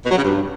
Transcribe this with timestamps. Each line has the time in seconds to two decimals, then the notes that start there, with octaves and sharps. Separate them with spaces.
0.04 B2
0.11 F#3
0.17 C#3
0.23 G2